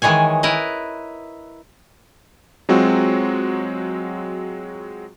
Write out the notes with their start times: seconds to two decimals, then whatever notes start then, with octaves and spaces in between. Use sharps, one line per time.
0.02 D#3 E3 G#3 C#5 G#5
0.43 E4 A#4 B4 D#5
2.69 F#3 G#3 C4 F4 F#4